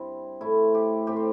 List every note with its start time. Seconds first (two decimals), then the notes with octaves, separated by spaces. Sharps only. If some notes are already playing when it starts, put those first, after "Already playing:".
Already playing: G2 G3 C4 E4
0.41 A2 A3 C4 E4
0.74 G4
1.07 A2 A3 C4 G4
1.16 C5